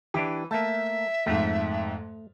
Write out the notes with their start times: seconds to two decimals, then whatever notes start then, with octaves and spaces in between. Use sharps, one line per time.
0.14 E3 D4 E4 G4
0.51 A3 A#3 E5 A5
1.26 F2 G#2 A3